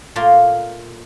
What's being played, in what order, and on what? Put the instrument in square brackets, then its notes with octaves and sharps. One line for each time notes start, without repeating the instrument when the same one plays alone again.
[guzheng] A#2 A3 A#3 F4 D5 C6